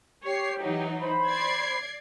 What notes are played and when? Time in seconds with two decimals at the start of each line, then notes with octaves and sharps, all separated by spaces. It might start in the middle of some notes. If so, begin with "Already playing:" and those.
0.23 G4 C#5 C7
0.60 E3 F#3 D#4
0.99 C5 B5
1.27 D5 G#6 C7